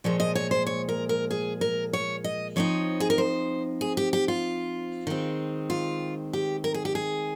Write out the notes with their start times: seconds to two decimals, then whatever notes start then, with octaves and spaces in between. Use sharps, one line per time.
0.04 A#2 F3 G#3 C#5
0.20 D#5
0.35 C#5
0.51 C5
0.67 C#5
0.89 A#4
1.09 A#4
1.31 G#4
1.61 A#4
1.93 C#5
2.24 D#5
2.56 F3 C4 D#4 C#5
3.00 G#4
3.10 A#4
3.18 C5
3.81 G#4
3.97 G4
4.13 G4
4.28 F4
5.07 D#3 G#3 C4
5.70 F4
6.33 G4
6.64 A#4
6.74 G#4
6.85 G4
6.95 G#4